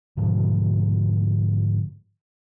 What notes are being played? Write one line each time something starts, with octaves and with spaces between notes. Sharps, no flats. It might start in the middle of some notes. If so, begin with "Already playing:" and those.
G#2 B2 D3 F3